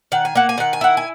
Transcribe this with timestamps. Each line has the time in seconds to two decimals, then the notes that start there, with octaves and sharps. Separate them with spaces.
0.12 D#3 F#5
0.25 G#5
0.35 A#3 F#5
0.49 G#5
0.58 D#3 F#5
0.73 G#5
0.81 E4 F#5
0.97 G#5